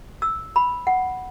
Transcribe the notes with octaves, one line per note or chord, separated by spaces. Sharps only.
E6
B5
F#5